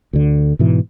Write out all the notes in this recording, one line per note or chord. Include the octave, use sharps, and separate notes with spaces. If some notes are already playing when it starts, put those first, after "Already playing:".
D2 D3
G#2 B2 E3